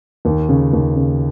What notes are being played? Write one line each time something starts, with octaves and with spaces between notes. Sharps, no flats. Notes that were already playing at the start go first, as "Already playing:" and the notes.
D#2
C#3
D#2
C#3